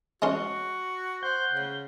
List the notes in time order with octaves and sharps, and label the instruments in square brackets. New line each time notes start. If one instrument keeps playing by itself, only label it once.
[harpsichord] G#3 C#4 C6 [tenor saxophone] F#4
[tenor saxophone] C5 [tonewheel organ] F#5 G6
[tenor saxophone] C#3